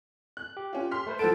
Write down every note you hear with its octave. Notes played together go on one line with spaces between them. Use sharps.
F#6
G4
C#4 F4
C6 F6 B6
A3 B4 C5
F3 A4 C5 F#5 A5 D7